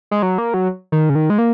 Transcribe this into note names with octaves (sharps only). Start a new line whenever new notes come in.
G#3
F#3
A#3
F#3
D#3
C#3
D#3
G#3
A#3